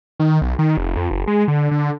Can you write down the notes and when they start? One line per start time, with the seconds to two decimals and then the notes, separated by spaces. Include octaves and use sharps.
0.20 D#3
0.42 B1
0.59 D#3
0.77 F1
0.97 F2
1.11 F#1
1.27 G#3
1.48 D3
1.71 D3